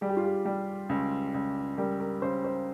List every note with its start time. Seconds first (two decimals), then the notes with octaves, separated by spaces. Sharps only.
0.01 G3 G#4
0.10 G4
0.17 F4
0.25 G4
0.45 G3
0.89 C#2
1.34 C#2
1.78 G3 A#4
2.00 A#4
2.22 C#3 C5
2.44 C5